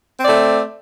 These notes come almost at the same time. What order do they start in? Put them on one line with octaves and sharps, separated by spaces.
C4 D5 A3